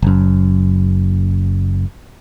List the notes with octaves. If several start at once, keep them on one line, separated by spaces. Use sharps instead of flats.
F#1 F#2